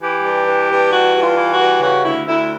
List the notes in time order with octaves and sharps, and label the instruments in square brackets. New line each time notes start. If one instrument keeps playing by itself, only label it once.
[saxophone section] E3 G4
G2
E3
G2
E3 F#4
G2
F4
E3
F#4
G2
C#3 F#4
D2 E4
D2 E4